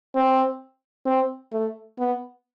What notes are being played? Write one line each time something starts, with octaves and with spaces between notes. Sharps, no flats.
C4
C4
A3
B3